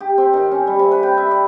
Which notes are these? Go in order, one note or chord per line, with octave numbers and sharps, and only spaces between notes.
G4
C4
D#3
C#4
G3
C3
B4
G5
E5
D5